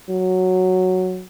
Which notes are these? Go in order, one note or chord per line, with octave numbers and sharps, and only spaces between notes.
F#3